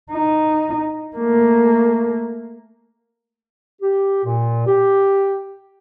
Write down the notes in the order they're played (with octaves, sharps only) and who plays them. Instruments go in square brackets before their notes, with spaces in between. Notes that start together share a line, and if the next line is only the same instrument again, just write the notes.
[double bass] D#4
A3 A#3
[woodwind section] G4
A#2
G4